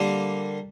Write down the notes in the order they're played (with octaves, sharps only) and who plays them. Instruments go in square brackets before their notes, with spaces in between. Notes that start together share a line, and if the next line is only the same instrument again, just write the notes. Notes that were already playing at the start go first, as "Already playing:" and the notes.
Already playing: [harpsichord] D3 G3 A#3